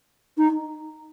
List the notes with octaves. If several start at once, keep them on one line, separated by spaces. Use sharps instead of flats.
D#4